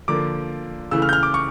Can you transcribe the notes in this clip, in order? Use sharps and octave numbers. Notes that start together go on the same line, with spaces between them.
D3 F3 A#3 D6
C#3 E3 A3 E6
F6
G6
F6
D6
C#6